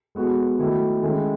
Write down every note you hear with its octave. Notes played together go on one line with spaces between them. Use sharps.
G#3 B3 F#4 A4
D#3 F#3 A3 E4
D#3 G#3 C#4 E4 A4